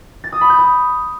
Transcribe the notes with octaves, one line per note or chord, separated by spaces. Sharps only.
A6
D#6
B5
G6
D#6